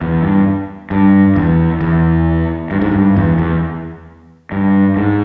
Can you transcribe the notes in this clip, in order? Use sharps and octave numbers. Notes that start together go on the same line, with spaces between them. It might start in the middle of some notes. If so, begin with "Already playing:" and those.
E2
G2
G2
E2
E2
G2
G#2
G2
E2
E2
G2
G#2